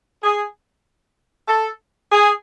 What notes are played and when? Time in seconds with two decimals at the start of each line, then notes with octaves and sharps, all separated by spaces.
0.22 G#4
1.47 A4
2.11 G#4